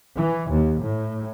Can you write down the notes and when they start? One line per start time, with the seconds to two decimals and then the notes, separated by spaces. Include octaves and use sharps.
0.17 E3
0.50 D#2
0.80 A2